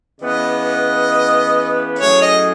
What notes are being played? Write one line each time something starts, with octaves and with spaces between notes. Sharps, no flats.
C#3 E3 B3 D#5
A2 F#3 A3 C#4 G#4 C#5
D#5